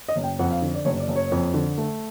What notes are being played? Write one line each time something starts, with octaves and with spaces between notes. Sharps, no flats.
D#5
F#1
G5
F2 F#5
F5
D3
D5
F#1 C#5
D5
F#1
C#5
F2
D3
A3